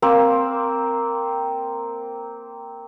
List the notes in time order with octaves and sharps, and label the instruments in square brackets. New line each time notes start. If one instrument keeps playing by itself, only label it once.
[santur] A#3 C4